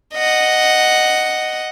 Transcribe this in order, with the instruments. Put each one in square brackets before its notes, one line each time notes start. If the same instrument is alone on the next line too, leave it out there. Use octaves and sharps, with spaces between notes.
[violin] D#5 F#5